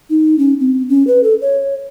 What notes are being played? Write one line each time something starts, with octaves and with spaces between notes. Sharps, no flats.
D#4
C#4
C4
C#4
B4
A4
C#5